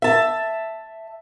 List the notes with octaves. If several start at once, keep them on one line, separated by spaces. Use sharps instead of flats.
E5 A5